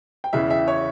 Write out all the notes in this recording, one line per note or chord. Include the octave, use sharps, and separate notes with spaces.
G5
E2 C#3 E3 E5
E5
C#5